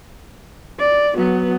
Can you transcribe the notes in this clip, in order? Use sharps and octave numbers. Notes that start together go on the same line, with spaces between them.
D5
F#3 B3